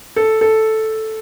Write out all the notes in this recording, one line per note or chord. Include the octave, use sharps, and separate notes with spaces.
A4
A4